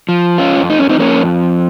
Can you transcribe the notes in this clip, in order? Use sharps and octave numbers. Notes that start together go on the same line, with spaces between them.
F3
C#4 F4
F2
D#4
C#4
C4 D#4
F2 A#3 C#4